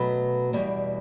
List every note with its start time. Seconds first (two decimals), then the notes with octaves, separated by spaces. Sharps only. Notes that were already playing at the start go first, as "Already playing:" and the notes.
Already playing: B2 F#3 A3 B4
0.53 E2 B2 G3